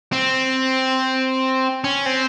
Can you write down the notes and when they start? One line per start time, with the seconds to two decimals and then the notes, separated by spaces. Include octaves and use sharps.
0.13 C4
1.84 C#4
2.06 C4